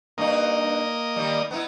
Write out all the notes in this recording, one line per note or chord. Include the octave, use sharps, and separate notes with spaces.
G2 A#3 D#4 D#5
D#3 G3
B3 D#4 E4